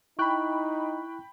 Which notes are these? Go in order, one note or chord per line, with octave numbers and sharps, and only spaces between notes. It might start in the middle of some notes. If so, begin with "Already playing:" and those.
D#4 E4 G5 B5 C#6 F#6